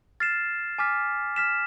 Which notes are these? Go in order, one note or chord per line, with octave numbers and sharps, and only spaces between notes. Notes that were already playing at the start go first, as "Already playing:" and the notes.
F6 A6 C7 E7
G#5 D6 F6 B6
F6 B6 E7